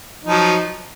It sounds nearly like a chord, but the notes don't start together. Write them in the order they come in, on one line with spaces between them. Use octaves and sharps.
D#4 F3 F#3